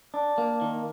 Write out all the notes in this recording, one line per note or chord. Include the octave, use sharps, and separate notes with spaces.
D4
A#3
D#3